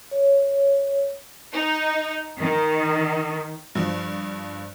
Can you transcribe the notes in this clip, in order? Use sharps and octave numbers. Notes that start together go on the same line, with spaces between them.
C#5
D#4
D#3
G2 F3